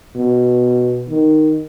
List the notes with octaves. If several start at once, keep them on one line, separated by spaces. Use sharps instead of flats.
B2
D#3